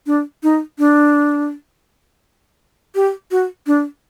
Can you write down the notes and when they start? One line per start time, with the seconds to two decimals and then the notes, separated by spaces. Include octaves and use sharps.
0.06 D4
0.43 D#4
0.79 D4
2.95 G4
3.31 F#4
3.67 D4